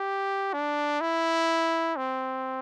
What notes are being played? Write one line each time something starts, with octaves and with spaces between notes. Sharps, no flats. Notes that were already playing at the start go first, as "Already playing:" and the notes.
Already playing: G4
D4
E4
C4